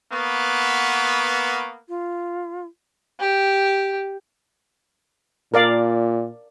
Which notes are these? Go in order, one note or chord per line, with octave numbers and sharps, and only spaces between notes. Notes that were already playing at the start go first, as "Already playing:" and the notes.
A#3 B3 C#6
F4
G4
A#2 A#4 D5 F5